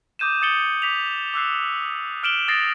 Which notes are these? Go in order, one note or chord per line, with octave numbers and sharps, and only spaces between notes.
D6 D#6 G6 D#7 E7
D#6 A6 C#7 F#7 G7
D6 B6 F7
D6 E6 F#6 C7
D6 F6 D7 E7 F#7 G7
D#6 A6 A#6 C7 D7